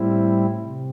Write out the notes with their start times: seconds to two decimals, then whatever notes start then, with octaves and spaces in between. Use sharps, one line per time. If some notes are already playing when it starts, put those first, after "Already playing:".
Already playing: A2 G3 C4 E4
0.62 C3